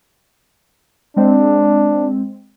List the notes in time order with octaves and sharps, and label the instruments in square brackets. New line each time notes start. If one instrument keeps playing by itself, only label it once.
[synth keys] G#3 C4 [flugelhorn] D4